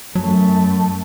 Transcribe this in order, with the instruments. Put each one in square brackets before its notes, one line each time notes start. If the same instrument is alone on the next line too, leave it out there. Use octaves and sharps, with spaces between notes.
[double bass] F#2 A3 [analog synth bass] F#3